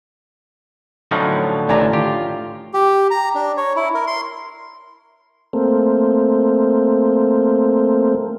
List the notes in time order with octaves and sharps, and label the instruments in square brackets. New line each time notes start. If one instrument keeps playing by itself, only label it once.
[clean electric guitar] A2 D3 F3 [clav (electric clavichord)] F#3 C#4 D#4
[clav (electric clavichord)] A1 [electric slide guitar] D#3 A3 [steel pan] D5 G#5 A#5
[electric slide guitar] F4 [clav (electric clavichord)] G4
[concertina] G4
A#5
D4
C#5
E4
A#4
C6
[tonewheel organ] A3 A#3 C4